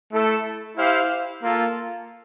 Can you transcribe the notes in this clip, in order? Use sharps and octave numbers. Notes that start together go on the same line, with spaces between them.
A3 E4 A4
E4 G4 C5 F5
A#3 F4 A4